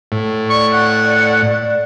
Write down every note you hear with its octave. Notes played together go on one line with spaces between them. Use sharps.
A2
D5 C#6
F#5